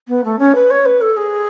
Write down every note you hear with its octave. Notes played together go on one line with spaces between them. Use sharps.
B3
A3
C#4
B4
C#5
B4
A4
G#4